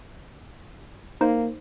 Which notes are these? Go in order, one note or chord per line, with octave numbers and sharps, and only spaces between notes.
A#3 D#4 C5